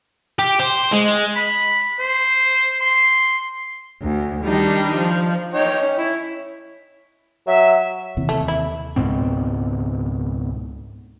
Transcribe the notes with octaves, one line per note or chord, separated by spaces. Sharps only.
G4
C5
G#3
B5
C5
C6
D2
D#3 G3 D4 D#4
F3
D#4 C#5 G5
C#4
E4
F#3 E5
D#2 C3 E3
A3
E4
C#2 G#2 B2 C4